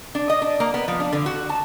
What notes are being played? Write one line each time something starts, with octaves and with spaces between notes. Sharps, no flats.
D4
D#5
D4
A#3
B3
F3
D4
D3
F#4
A5